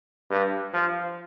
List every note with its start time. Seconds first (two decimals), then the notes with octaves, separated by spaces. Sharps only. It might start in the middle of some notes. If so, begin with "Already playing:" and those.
0.31 G2
0.73 F3